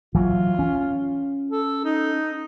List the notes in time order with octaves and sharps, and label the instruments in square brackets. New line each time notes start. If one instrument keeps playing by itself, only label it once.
[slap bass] E3 F#3 [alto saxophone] F4
[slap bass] C#4
[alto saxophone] A4
D#4